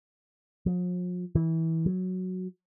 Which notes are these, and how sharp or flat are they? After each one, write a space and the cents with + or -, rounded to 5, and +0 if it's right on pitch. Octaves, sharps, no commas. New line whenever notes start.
F3 +45
E3 -20
F#3 -5